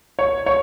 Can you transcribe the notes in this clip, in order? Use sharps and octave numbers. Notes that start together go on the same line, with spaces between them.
C#5
C#5